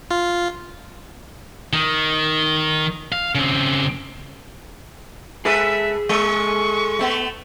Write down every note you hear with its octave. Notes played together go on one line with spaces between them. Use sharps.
F4
D#3
F5
C#3 C4
G#3 G#4 A4 B4 E5
G#3 A4 C#6
A3 B3